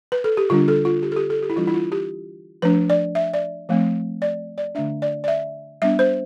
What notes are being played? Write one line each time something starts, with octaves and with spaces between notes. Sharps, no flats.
B4
A4
G4
D3 G3 D4 F4
A4
F4
G4
A4
G4
A4
G4
E4
E3 G3 D4 F4
E4
F4
G4
F3 A3 D4 B4
D5
E5
D5
F3 A3 C4
D5
D5
D3 A3 D4 E5
D5
D5
E5
G3 B3 D4 E5
C5